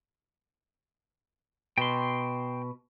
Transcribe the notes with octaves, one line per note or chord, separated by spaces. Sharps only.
B2 G5 C6